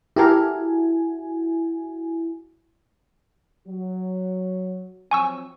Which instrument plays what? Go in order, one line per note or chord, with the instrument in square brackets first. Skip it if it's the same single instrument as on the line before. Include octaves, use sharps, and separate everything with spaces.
[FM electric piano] E4 F#4 G#5 [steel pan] G4 A4 A#4
[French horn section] F#3
[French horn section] F3 F#3 C4 [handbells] G#5 C#6 E6